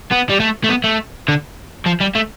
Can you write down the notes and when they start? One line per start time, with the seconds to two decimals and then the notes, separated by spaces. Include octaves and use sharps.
0.11 B3
0.29 G3
0.40 A3
0.64 A3
0.69 B3
0.84 A3
1.28 D3
1.86 F3
2.00 G3
2.15 A3